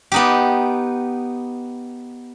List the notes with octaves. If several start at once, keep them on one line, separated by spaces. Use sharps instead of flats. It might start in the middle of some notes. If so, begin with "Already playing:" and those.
B3 D#4 G4